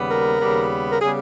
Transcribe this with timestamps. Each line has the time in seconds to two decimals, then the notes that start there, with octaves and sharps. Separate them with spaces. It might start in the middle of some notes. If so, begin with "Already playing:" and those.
Already playing: D#2 C#3 G3 B3
0.10 A#4
0.40 D#2 C#3 G3 B3
0.91 A#4
1.01 C#3 G3 B3 G#4